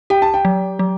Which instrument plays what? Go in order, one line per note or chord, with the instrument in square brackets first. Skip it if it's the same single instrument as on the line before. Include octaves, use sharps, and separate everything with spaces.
[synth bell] G4 [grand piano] G5
[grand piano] A5
G5
[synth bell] F#3
F#3